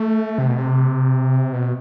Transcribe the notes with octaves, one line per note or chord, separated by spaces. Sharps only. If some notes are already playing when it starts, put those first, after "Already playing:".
Already playing: A3
C3
B2
C3
B2